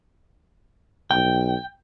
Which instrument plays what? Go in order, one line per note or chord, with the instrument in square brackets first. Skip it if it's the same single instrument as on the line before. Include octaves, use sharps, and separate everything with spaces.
[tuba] B1 [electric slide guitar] G5